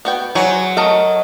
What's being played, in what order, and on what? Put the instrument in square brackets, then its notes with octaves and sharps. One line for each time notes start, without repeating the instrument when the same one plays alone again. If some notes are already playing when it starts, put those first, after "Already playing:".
[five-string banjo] B3 F#4 G5
[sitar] F#3 [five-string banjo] F#4 G#4 C5
[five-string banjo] A3 A#4 A#5 [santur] D#5